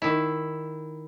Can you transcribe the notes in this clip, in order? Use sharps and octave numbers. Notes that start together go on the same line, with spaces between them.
D#3 E4